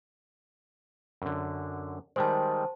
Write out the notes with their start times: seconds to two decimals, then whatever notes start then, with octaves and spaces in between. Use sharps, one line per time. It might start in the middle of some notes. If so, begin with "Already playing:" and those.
1.22 F#2 D3
2.16 D#3 G3 G#3 C5 A5